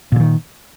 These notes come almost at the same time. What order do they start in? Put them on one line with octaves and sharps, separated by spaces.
A#2 D3 D#3